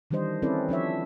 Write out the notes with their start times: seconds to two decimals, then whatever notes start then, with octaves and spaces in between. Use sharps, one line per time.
0.11 D#3 E3 G3 D4 C5 D#5
0.42 C4 C#4 E4 A4 B4 D5
0.69 F3 D4 C#5 E5